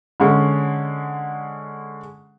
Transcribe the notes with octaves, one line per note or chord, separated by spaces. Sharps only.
D3 G#3 C#4